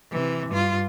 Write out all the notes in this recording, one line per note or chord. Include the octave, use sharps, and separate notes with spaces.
C3 E3
G2 F4